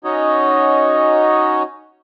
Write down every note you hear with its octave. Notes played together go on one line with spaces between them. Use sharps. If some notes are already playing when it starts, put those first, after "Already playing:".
C#4 D#4 F#4 C#5 D#5